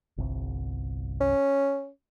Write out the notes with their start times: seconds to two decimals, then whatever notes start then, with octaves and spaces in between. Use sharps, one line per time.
0.18 G1 C2
1.21 C#4